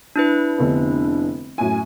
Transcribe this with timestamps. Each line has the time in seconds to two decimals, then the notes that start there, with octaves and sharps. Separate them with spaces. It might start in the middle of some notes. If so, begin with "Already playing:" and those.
0.16 D4 E4 B4
0.58 F1 D3 B3
1.58 F#2 A2 G#5